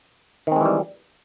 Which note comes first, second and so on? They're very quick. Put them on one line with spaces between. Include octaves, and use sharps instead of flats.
D#3 C4 G#3 E3 G3